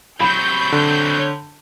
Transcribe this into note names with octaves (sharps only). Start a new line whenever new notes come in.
C3 F#3 B5 G6
D3